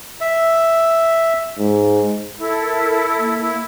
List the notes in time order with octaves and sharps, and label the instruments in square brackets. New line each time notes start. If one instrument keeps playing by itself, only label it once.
[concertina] E5
[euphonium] G#2
[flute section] E4 A4
[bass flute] A#4
A#3
[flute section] E4